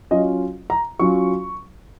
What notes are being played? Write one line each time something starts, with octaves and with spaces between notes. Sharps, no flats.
F#3 C#4 F4 D#5
A#5
F#3 C#4 F4 C#6